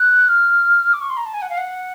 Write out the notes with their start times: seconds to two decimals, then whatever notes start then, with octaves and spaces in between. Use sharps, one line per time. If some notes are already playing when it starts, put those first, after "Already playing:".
Already playing: F#6
0.28 F6
0.93 D6
1.01 C#6
1.10 C6
1.17 A#5
1.26 A5
1.34 G#5
1.42 F#5
1.50 F5
1.58 F#5